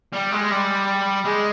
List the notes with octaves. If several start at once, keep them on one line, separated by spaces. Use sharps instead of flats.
G3
G#3
G3
G#3